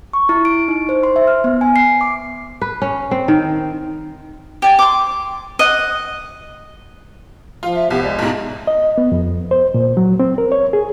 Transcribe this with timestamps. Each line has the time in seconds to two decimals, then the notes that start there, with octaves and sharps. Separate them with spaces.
0.13 C#6
0.29 E4
0.45 D7
0.68 D#4
0.89 C5
1.03 C6
1.16 E5
1.27 F6
1.44 B3
1.61 G#5
1.76 C7
2.01 D6
2.61 B4
2.82 C#4
3.11 C4
3.28 D#3
4.62 G4 D5 G#5
4.79 C6 D6
5.59 D#5 F#5
7.63 F3 F4
7.74 E5
7.90 C2 B3 G4
8.03 G#3 D5
8.19 B1 G#2 A#5
8.67 D#5
8.98 B3
9.12 F2
9.51 C5
9.74 A#2
9.97 F#3
10.20 C4
10.38 A#4
10.52 C#5
10.73 G#4